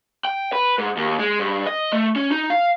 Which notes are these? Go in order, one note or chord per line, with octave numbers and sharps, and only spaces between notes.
G5
B4
G#2
D#2
G#3
G2
D#5
A3
C#4
D#4
F5